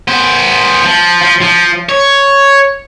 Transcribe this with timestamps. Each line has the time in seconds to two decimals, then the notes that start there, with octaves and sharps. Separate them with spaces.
0.08 B3 C5
0.84 F3
1.21 F3
1.42 F3
1.89 C#5